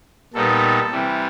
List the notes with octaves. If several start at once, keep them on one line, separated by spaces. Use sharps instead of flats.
A#2 G3 B3 D#4 A4
C3 E3 G3